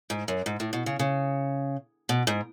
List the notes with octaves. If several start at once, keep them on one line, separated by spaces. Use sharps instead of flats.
G#2
F#2
G#2
A2
B2
C#3
C#3
B2
G#2